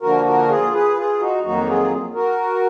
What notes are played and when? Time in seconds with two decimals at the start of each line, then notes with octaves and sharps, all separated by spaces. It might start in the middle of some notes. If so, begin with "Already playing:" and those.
0.01 D3 F3 A#3 F#4 A#4
0.25 F#4 A#4
0.49 F4 G#4
0.72 G#4 B4
0.96 F4 G#4
1.20 D#4 F#4
1.43 F2 D#3 F#3 A#3 D#4 F#4
1.67 F4 G#4
2.14 F#4 A#4